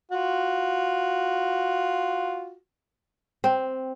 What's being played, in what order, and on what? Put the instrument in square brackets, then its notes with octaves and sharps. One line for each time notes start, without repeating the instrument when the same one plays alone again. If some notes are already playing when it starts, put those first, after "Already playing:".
[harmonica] F4 F#4
[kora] C4